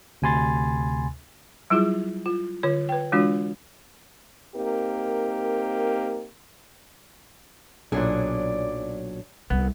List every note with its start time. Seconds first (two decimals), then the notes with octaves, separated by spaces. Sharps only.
0.22 D2 C3 G#5 B5 C6 A6
1.70 F#3 G3 E4 F4 G#4
2.26 F4
2.63 D3 F4 C#5
2.89 B4 G5
3.12 E3 G#3 D4 F4 F#4
4.56 A#3 C4 D#4 G4 A#4
7.92 B1 A#2 F#3 D4 G#4 D5
9.50 C2 B3